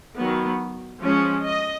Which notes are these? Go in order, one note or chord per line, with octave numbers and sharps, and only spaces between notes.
D#3 F#3 B3
F3 G#3 C#4
D#5